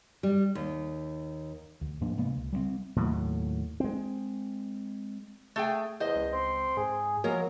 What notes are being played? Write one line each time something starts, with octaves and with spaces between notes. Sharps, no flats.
G3
D#2
D2
G#2 F3 A#3 D4
C3 G#3 A#3 B3
C#2
G3 G#3 C4
D#2 A2 F#3
G#3 C4
A3 G#4 G5
E2 C5 D#5
C#2
C4 C6
G#2 G#4
F3 F#3 G#3 A#3 A#4